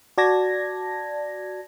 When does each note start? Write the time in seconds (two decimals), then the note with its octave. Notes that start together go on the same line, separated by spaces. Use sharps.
0.18 F#4 D5 A5 G#6 A#6